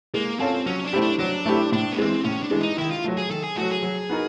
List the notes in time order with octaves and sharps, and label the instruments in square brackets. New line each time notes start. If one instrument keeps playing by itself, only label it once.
[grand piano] G#3 [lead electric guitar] A#3
[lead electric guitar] C4 [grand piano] C#4 F4 A4
[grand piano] F#3 [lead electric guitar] C#4
[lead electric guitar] D4
[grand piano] A3 C4 E4 G4
[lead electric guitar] D4
[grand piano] F#3 [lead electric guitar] D4
[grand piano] A3 C4 E4 G4
[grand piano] A2 [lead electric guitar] D4
[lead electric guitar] B3
[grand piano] E3 G#3 [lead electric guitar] C4
[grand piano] A2 [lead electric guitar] C#4
[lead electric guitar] D4
[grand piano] E3 G#3
[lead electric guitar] D#4
[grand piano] D#3 [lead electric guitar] E4
[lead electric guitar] F4
[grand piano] F#3 A3
[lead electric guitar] G#4
[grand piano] D#3 [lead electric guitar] A4
[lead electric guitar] G#4
[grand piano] F#3 A3 [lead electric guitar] F#4
[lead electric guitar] G#4
[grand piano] F#3
B3 D#4 F#4 A#4